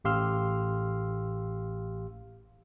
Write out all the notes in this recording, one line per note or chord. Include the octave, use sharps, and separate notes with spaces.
A1 G4 F5 C6 E6 F6